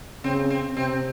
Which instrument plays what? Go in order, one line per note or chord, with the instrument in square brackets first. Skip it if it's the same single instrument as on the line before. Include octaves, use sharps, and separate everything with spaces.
[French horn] C#3 [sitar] C4
[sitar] C4
[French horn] C3 [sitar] C4